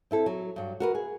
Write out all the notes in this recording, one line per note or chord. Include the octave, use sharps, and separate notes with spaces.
C4 E4 A4
F#3
G2 F#3
F#4 A#4 B4
G#4